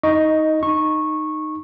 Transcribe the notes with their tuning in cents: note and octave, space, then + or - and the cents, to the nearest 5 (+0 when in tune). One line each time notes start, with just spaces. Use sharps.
D#4 +20 D#5 +0 C#6 +0
D#4 -10 C#6 -15